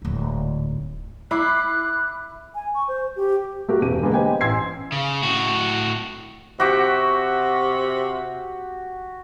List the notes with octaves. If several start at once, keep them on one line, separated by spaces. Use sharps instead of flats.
D1 G#2
E4 B5 D6 F#6 C7
G#5
C#6
C5
G4
A3 F#4 G4 A#4
E1 G4 D#7
D3 G#3 A#3 B3
G4 B4 C5 D#5 G5 G#5
A1 G#5 C6 E6 G#6 C7
C#3
A2 F#4
C3 F#4 G4